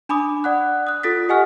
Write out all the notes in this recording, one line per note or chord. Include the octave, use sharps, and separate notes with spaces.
D4 G#5 B5 D6 D#6
D5 F#5 F#6
D#6 F#6
F4 A4 D#6 A6 B6
G4 D#5 F#5 G#5 C#6 F6